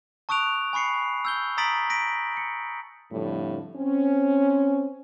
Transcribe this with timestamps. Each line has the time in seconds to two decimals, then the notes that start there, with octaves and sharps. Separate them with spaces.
0.29 A5 C#6 D#6 F#6 D7 F7
0.73 G#5 B5 C#6 C7 C#7
1.25 E6 G6 G7
1.58 A#5 D#6 A6 B6 D7 F#7
1.90 A#6 B6 D7
2.37 C#7
3.11 F2 A2 D3 F3 G3
3.76 C4 C#4